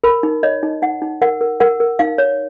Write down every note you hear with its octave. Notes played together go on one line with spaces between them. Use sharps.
A#4 B5
D#4
C#5 D#5
D#4
D#4 F#5
D#4
A#4 F#5
A#4
A#4 F#5
A#4
D#4 F5
C#5